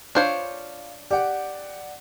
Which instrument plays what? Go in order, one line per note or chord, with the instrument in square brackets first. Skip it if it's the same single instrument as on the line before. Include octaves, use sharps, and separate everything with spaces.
[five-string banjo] D4 C5 C#5 [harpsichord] F4
[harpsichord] G4 [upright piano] D5 F#5